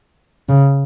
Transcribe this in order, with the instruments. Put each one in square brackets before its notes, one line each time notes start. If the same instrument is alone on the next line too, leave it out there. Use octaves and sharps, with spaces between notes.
[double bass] C#3